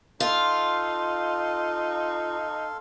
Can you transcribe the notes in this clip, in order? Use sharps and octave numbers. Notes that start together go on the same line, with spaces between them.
D#4 F4 A4 F5 C6